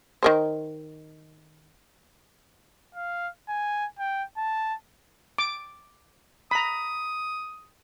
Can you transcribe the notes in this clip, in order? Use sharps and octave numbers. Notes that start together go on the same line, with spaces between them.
D#3 A#4 C5
F5
G#5
G5
A5
D6
A#5 B5 D#6